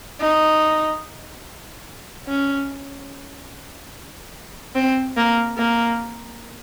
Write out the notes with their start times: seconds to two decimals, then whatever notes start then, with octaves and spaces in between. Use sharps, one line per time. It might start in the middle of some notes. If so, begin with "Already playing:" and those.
0.21 D#4
2.28 C#4
4.75 C4
5.17 A#3
5.58 A#3